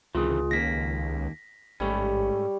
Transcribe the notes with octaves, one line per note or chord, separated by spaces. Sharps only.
C#2 C3 D#3 E3 F4 G#4
D#2 A#3 A#6 B6
A1 G#2 G3 A3 C#4 C#5